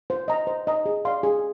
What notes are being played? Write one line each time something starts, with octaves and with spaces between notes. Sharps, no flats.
C5
D#5 A#5
C5
D#5 A#5
G#4
D5 F5 C6
G#4